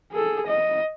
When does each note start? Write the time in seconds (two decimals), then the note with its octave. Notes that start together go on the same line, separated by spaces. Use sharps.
0.12 G#4 A4
0.47 D#5